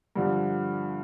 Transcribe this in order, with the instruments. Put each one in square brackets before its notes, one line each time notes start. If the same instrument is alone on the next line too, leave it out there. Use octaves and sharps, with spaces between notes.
[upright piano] G2 D3 F3